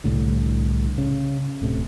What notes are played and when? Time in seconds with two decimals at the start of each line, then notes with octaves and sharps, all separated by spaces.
0.04 C2 A2 D3
0.98 C#3
1.62 D1 A2 C3